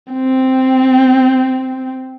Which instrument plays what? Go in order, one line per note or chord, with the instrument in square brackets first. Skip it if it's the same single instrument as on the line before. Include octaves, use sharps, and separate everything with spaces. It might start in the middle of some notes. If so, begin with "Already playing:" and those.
[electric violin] C4